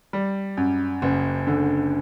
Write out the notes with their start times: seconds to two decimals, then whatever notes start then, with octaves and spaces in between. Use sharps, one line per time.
0.13 G3
0.57 F#2
1.02 F#1
1.47 D3